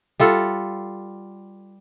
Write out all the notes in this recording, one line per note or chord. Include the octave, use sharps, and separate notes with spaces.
G3 F4 A4 F#5